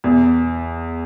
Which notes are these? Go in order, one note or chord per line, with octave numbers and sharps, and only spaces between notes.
E2